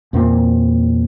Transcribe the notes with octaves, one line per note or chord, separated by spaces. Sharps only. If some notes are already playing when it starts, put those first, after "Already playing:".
E2 A#2 C4